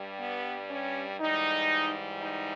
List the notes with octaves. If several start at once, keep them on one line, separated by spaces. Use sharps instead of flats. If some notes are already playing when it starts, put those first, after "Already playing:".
Already playing: G2 G3
B3
C#4
G#2 E3 G3 D#4
D#4